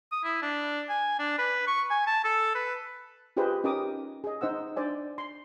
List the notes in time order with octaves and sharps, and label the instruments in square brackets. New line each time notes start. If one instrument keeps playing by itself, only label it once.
[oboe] D#6
E4
D4
G#5
D4
B4
C#6
G#5
A5
A4
B4
[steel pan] F4 G4 G#4 B4 C5 D#5
C#4 D#4 G4 A#4 D6 D#6
G#4 D#5
D#4 C5 F#5 E6
D4 C5 D5 G#5
C6